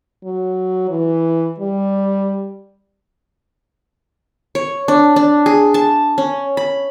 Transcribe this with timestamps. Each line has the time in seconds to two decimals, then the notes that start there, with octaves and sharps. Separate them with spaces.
0.24 F#3
0.90 E3
1.60 G3
4.55 C#5
4.88 D4
5.16 D4
5.46 G#4
5.74 A5
6.18 C#4
6.57 B5